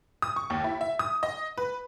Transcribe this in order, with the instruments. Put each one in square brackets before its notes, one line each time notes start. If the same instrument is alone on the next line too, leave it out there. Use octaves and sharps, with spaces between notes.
[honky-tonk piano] D#6
C#6
D#2
E4
E5
D#6
D#5
B4